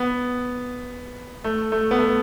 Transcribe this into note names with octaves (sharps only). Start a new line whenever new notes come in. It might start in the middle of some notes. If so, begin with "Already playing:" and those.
Already playing: B3
A3
A3
B3
A3